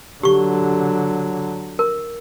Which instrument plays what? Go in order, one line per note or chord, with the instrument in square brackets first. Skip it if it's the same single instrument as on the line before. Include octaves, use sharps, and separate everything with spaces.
[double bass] D3 F#3 [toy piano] G4 C#6
[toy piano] A#4